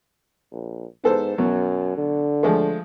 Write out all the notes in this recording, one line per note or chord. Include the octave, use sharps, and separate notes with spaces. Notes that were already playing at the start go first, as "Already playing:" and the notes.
A#1
G#2 B3 A4 C5
F#2 B2 F#3
D3
F3 G#3 A3